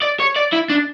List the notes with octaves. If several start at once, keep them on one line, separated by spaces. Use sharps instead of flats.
D5
C#5
D5
E4
D4